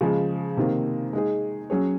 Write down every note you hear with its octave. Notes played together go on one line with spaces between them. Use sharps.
C#3 F3 G#3
C3 D#3 A#3
G#3 D#4 G#4
F#3 C#4 G#4 C#5